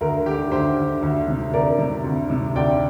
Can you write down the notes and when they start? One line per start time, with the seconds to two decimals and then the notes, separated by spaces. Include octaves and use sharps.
0.01 D2 A#4
0.26 D3 G4
0.52 D2 G4 C5
0.77 D3
1.02 D2
1.28 C3
1.53 D2 A#4 D5
1.78 C3
2.04 D2
2.30 C3
2.55 D2 D5 G5